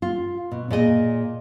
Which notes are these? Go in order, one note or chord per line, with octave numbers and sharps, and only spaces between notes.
F4
B2
A#2 G#4 D#5